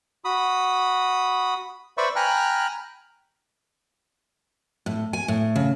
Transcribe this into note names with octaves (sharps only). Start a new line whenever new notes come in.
F#4 B5 D#6
B4 C5 D5 E5 B5 C#6
G5 G#5 A#5 B5 F6 F#6
A2
G#5
A2
C#3